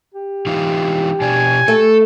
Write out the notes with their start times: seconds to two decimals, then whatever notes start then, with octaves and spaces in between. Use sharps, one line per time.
0.14 G4
0.46 E3 D#4 F4
1.21 B2 D4 D5 G#5
1.68 A3 A4